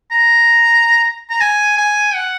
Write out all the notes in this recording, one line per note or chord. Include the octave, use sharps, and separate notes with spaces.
A#5
A#5
G#5
G#5
F#5